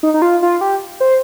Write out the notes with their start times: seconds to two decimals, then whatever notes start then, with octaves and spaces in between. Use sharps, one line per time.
0.03 D#4
0.14 D#4
0.22 F4
0.42 F4
0.61 G4
1.00 C5